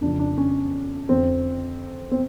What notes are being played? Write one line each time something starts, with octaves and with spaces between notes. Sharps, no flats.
F2 C#3 F3 D4
D4
C#4
F2 D3 F3 C4
C4